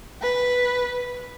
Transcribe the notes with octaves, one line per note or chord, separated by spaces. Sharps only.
B4